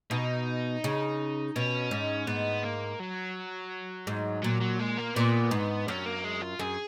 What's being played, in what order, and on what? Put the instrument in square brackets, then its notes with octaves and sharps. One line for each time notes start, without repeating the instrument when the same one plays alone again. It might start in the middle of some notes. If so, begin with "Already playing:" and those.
[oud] B2 [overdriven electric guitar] D#4
[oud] C#3
[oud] B2 [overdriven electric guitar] C#4
[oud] G#2
[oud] G#2 [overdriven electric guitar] B3
[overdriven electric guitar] A#3
F#3
[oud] G#2
[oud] A#2 [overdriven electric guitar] F#3
[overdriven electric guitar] F#3
G#3
A#3
[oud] A#2 [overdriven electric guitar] B3
[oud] G#2
[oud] F#2 [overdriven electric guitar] C#4
[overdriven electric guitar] A#3
G#3
F4
[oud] F#2 [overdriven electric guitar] G#4